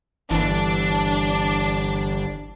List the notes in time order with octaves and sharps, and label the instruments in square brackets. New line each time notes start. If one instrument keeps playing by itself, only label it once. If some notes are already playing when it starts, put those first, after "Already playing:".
[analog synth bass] G1 [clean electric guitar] E3 [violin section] D4